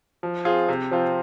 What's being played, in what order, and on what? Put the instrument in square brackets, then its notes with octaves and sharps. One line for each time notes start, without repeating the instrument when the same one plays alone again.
[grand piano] F3
C4 F4 G#4
C3
F3 C4 F4